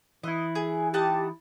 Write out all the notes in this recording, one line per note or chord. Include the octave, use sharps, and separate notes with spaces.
E3 E4 D#5
G#4
D#4 G4 F#5 A5